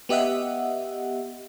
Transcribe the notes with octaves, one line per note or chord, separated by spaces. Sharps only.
B3 G4 D#5 E5 F#5